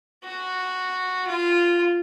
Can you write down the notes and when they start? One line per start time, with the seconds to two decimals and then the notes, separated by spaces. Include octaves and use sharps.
0.24 F#4
1.27 F4